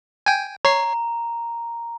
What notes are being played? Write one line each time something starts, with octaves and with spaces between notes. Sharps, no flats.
G5 G#5
C#5 A#5 C7